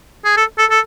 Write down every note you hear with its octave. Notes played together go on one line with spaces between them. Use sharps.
G#4
A4
A4
A4